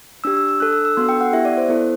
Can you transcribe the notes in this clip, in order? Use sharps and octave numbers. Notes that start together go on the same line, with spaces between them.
D4 G4 E6
E6
E6
D4 A4 F#6
E6
E6
B3 D4 F#4 A4 C6
G5
F#5
B3 E4 G4 E5
D5
C5
B3 E4 A4